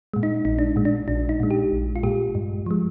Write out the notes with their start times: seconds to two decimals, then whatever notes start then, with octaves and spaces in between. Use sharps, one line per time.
0.14 A#2 G#3
0.23 D#4
0.45 A#1 D#4
0.59 D4
0.76 A#2 G#3
0.85 D4
1.08 A#1 D4
1.29 D#4
1.40 A#2 G#3
1.51 G4
1.72 A#1
1.96 F4
2.03 A#2 G#3 G4
2.35 G2
2.66 F3 G#3